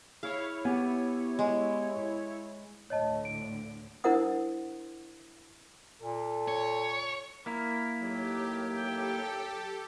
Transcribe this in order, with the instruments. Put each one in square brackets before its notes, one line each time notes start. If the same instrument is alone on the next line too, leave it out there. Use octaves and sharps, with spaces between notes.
[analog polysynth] E4 C#5 [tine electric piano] G#4 [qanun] F5
[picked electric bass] B3 [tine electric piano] G4 G#5
[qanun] G#3
[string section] D2 A2 D3 [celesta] C#5 D#5 A5
[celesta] D7
[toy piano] D4 E4 A#4 C5 F#5 D#6
[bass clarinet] A#2 [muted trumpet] A4
[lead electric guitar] C#5
[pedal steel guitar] A#3 E4 A#4
[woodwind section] D#2 A2 F#3 [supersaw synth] G4
[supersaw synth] G4 A4 [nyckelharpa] G5